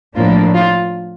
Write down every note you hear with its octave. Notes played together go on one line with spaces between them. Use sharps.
A2 F3 A#3 D4 F4
F4